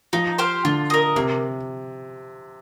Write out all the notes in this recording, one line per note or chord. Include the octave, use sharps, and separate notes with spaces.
F3 D#4
G4 C5 F5
D3 F4
A#4 D#5
C3 A#3